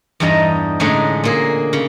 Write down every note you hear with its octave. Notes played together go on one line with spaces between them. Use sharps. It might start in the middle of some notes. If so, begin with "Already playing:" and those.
E2 G2 G3 D#4 D#5 A#5
A2 D3 G#3 C#4 D#4
A#2 A#3 G#4
C#3